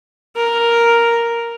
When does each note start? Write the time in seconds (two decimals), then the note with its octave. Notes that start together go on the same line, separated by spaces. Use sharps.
0.36 A#4